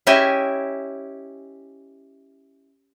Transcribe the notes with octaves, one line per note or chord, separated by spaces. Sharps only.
C#4 E4 G4 D#5 E5 G#5